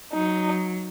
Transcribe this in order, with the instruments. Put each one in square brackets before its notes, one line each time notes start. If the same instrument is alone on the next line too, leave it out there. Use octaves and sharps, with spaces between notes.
[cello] F#3 [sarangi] D#4